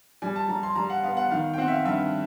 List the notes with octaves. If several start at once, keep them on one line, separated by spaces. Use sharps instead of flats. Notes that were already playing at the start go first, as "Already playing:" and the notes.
G3 G#5
A5
G3 A#5
C6
G3 A#5
F#5
B3 F5
F#5
D#3 F5
G5
C4 F#5
E5
F5
G2 E5